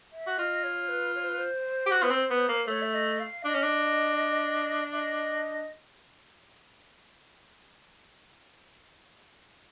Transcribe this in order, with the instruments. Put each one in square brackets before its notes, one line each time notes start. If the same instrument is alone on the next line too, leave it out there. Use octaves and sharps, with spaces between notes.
[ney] E5
[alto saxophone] F#4
[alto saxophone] F4 [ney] D#5
[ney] C#5
B4
C#5
C5
B4
C5
[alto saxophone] G4
F#4
B3
C4
B3
A#3
[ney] C5
[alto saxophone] A3 [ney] C#5
[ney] E5
D#5
F5
[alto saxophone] D4 [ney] D#5
[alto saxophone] C#4
D4
[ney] E5
D#5